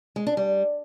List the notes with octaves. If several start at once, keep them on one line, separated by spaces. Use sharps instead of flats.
G#3
D4
G3